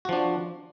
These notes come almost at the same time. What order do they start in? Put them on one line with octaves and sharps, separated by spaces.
F#4 F3 D4